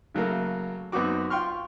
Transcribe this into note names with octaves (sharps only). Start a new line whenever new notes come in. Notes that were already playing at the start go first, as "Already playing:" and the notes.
C#3 F#3 A3 A#3
F#2 B3 C4 D#4 F#4 D6
F4 G5 C6 C#6 F6